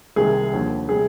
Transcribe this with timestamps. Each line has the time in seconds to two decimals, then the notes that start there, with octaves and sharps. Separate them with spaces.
0.16 C2 C3 D#3 G#3 G#4
0.52 D#2 D3 F3
0.89 C3 G3 G#4